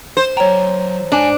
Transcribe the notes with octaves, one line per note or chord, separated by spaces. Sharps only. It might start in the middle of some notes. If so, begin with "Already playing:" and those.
C5
F#3 C#5 G5 A#5
G#2 D4 G#5